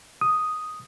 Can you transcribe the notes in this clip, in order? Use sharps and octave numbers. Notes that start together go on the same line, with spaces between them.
D#6